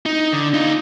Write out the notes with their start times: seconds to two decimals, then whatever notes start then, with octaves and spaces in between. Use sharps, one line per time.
0.06 D#4
0.33 D3
0.54 D#4 F4